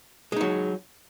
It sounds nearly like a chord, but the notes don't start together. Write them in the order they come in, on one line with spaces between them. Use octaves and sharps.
G#3 D#4 F#3